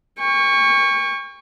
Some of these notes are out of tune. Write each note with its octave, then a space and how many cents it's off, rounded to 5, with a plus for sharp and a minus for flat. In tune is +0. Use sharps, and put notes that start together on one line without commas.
G5 +45 C#6 +0